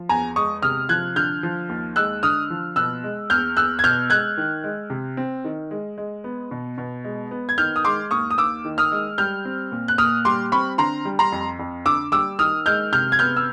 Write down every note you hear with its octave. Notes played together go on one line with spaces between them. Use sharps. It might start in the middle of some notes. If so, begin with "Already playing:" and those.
Already playing: F3
E2 G#5 A#5
G#3 C#6 D#6
C3 D#6 F6
F3 F#6 G#6
D3 F6 G6
F3
D#2
G#3 E6 F#6
D3 D#6 F6
F3
B2 E6 F#6
G#3
E2 F6 G6
E2 E6 F#6
G#6
B2 F6 G6
G#3 F#6 G#6
D#3
G#3
C3
C4
D#3
G#3
G#3
B3
B2
B2
G#3
B3
G#6
D#3 F6 G6
D#6
G#3 C6 D6
D#2 C#6 D#6
D#6
D#2 D6 E6
D#3
D#6 F6
G#3
G3 F6 G6
C4
A#2
F#6
A#2 D#6 F6
G3 C6 D6
C4 B5 C#6
D3 A#5 C6
G3
A#5 C6
F2
F2
D3 D6 E6
G3 D6 E6
D#3 D#6 F6
G#3 F6 G6
C3 F6 G6
G#6
B3 F6 G6
E6